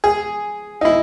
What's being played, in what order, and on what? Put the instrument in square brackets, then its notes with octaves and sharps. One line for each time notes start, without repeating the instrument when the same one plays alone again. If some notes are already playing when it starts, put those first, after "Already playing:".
[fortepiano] G#4
D#4
E4